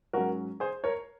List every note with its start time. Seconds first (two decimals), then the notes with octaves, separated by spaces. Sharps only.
0.13 G#2 F#3 C#4 F#4 A#4
0.60 G#4 C5
0.84 A#4 C#5